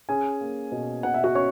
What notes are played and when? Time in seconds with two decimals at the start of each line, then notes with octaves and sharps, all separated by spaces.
0.09 C#4 G#4 G#5
0.41 A#3
0.72 B2
1.03 B2 F#5
1.14 E5
1.24 F#4 F#5
1.35 C#4 C#5 C#6